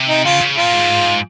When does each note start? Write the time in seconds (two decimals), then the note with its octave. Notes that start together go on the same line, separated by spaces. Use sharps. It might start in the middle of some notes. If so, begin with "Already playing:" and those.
Already playing: C3
0.09 D#4
0.25 C#3 F4
0.41 C#3
0.57 A#2 F4
0.73 G#2